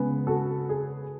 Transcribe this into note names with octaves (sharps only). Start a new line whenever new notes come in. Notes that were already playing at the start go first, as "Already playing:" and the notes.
Already playing: C#3 G#3 B3
F#4 A4
G#4